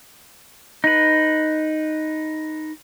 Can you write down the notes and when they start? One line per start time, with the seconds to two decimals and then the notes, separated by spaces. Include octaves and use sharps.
0.84 D#4 B4